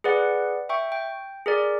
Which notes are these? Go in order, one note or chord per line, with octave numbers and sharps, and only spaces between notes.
G#4 B4 D5 F#5
E5 G5 C#6
G5
G#4 A#4 D5